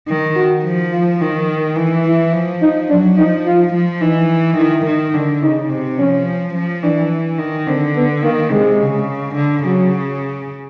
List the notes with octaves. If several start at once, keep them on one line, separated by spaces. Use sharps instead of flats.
D#3
F#4
F3
F4
D#3
E3
E4
F3
D#4
F#3 D4
F3 D#4
F4
F3
E3 D#4
D#3 E4
D#3
D3
C#3 D#4
C3
F3 C#4
F3
E3 D4
D#3
D3 C4
B3
D#3 A#3
C3 G#3
C#3
D3
C#3 F#3